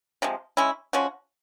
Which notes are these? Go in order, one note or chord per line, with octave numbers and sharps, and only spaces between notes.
C3 F3 G#3
G#3 C#4 E4
F3 G#3 C#4 F#4